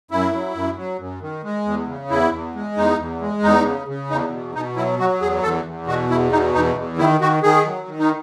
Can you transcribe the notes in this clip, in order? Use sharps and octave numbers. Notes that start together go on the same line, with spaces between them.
F#2 E4
F#3
F#2
F#3
F#2
D#3
G#3
E2
C#3
E2 E4
E2
G#3
E2 D#4
E2
G#3
E2 D#4
C#3
C#3
E2 D#4
B2
B2 D#4
F#3 E4
F#3 F#4
E2 G#4
E2 A4
E2
B2 F#4
E2 E4
B2 D#4
E2 D#4
E2
D#3 E4
D#3 F#4
D#3 G#4
F#3
D#3
D#4